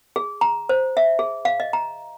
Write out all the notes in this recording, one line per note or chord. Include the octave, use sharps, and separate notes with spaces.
G#4
A#5
C5
E5
G#4
F5
D#5
A#5